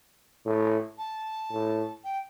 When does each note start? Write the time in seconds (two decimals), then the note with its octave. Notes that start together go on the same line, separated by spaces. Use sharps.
0.46 A2
0.98 A5
1.52 A2
2.04 G5